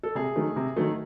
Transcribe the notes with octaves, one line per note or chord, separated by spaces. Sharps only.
A4
C3 G#4
D#3 F#3 A3
C3
D#3 F#3 A3